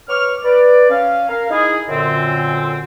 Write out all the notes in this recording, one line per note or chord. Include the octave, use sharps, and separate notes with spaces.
B4 C#5 C#6 D6 F6
B4 D5
C#4 F5
A#4 F5
D#4 E4 G#4
F#2 A#2 D3 C4